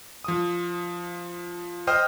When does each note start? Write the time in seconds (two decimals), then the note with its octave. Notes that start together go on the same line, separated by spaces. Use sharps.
0.24 F3 D#6
1.87 C5 D#5 G5 D#6 F6